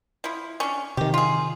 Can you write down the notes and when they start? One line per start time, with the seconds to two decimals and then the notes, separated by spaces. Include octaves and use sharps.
0.24 F3 E4
0.60 C#4 D4
0.97 C3 D#3 G4
1.14 F4 G#4